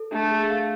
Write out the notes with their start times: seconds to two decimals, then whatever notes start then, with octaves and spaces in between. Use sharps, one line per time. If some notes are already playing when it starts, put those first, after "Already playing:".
Already playing: A4
0.12 A3 D4
0.31 G#4
0.50 F5